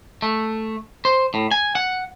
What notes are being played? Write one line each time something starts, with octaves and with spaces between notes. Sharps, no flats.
A3
C5
A2
G#5
F#5